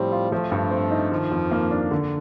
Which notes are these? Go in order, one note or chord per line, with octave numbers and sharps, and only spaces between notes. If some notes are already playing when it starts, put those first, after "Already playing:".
Already playing: A2 F3 G3 C4
F4
F3 A3
G2
C4
D#4
D#3 F3
F2
A#3
D4
D3